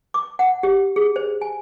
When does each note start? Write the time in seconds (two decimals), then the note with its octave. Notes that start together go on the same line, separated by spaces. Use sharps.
0.14 D6
0.39 F#5
0.63 G4
0.96 G#4
1.16 C5
1.41 G#5